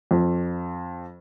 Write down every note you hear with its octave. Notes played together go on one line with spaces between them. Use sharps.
F2